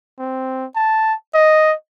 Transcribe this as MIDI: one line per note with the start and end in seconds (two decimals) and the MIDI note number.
0.19 0.65 60
0.76 1.14 81
1.34 1.74 75